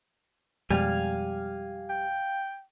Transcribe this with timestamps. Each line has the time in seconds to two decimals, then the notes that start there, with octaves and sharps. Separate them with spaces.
0.70 F2 B2 G3 G#3 F5 G#5
1.90 G5